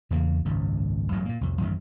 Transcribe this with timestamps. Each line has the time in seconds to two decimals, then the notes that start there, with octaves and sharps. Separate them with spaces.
0.11 E2 C#3 A#3
0.45 G#1 C#2 F#2
1.12 A1 G2 F#3 A3
1.25 A#2 A#3
1.41 C2 F2
1.61 A1 F#2 D3 D#3